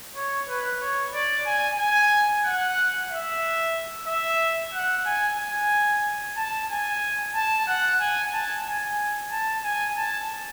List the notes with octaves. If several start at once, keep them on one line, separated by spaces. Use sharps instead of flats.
C#5
B4
C#5
D5
G#5
G#5
F#5
E5
E5
F#5
G#5
G#5
A5
G#5
A5
F#5
G#5
A5
G#5
A5
G#5
A5